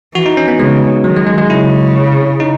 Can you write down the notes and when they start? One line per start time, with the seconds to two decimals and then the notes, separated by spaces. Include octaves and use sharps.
0.14 E3 F#4
0.26 D#4
0.37 C#4
0.48 B3
0.59 C#3 G#3
1.04 D#3 F#3
1.16 G#3
1.27 G#3
1.38 G#3
1.50 C#3 E4
2.40 D#4